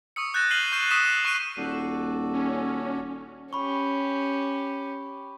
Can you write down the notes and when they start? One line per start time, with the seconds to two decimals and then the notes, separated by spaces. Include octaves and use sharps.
0.16 C#6 D#6 E6 C#7
0.34 E6 F#6 G6 A6 A#6 E7
0.50 F6 C7 D#7 F#7 G7
0.72 C#6 G6 C7 D#7 E7
0.90 C#6 D#6 E6 B6 E7 F#7
1.25 C#6 F#6 C7 D#7 E7
1.57 D#1 F#4 A4 D5
2.33 C#4
3.53 C#4 G4 B5 C#6